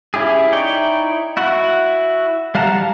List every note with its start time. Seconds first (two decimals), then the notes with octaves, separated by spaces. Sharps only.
0.14 C#4 E4 G4 G#4
0.52 D#4 E4 C#5 D5 G5
1.37 E4 F#4 F#5
2.55 G3 F5 F#5 A5 A#5